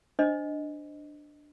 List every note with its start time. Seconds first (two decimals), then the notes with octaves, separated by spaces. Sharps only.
0.19 D4 C5 D#5